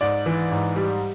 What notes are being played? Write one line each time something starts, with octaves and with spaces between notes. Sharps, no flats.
G#2 D5
E3
G#2
G3